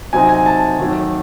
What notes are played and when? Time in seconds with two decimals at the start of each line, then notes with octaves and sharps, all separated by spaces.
0.13 C3 F#3 C4 D#4 G#5
0.29 G#5
0.46 A5
0.79 D#2 D#3 F#3 A3